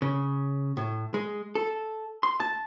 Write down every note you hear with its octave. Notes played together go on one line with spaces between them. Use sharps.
C#3
A2
G#3
A4
C6
A5